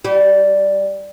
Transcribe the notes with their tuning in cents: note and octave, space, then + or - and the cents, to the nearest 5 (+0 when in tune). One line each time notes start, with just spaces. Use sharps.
G3 +0 G4 -40